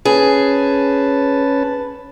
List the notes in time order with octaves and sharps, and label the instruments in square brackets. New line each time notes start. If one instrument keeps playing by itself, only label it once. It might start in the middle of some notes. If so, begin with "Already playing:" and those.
[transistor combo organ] C#4 B4 A5 [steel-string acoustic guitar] G#4